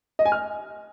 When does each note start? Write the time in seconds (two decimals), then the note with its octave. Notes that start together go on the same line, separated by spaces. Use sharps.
0.19 D#5
0.25 G#5
0.32 F6